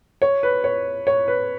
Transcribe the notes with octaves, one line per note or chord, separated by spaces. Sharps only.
C#5
B4
C#5
C#5
B4